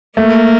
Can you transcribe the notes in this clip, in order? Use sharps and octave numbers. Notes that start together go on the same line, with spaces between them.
A3 A#3